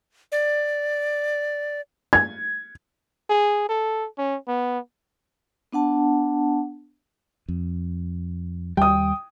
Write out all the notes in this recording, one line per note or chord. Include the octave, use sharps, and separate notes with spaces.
D5
G#6
G#4
A4
C#4
B3
B3 D4 F#5 A5
F2
D#2 G3 G5 D#6